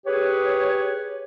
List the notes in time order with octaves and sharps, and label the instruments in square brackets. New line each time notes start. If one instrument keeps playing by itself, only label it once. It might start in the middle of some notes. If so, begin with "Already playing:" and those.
[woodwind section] G4 G#4 B4 C#5